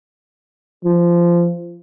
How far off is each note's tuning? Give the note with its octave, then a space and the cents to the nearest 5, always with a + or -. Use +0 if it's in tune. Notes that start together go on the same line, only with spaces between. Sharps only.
F3 -15